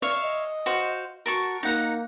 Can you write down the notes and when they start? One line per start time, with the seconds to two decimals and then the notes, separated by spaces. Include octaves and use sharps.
0.02 C#5 D5 E5 F5
0.22 D#5
0.66 F#4 C5 F5
1.26 F#4 A#4 A5 C#6
1.63 A#3 D#4 F#5 A#5